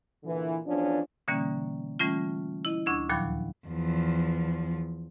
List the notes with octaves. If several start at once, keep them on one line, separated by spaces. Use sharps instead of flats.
A#2 D3 E3
E2 F3 C#4 D4
B2 D3 E3 G3 A#3 C#4
E3 G3 A3 C#4 F4
E4 D#5
D2 D4 C#6 E6 G#6
D#2 A#2 D#3 F3 F#3 B5
E2 F3